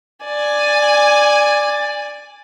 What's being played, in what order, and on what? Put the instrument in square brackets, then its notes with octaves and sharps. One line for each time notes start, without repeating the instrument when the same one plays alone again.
[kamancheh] D5 G#5